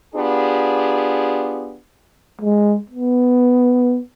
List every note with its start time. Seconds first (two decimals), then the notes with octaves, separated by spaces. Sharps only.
0.14 B3 D4 F4 G4 G#4
2.41 G#3
2.90 B3